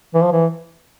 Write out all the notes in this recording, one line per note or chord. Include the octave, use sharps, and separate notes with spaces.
E3
F3
E3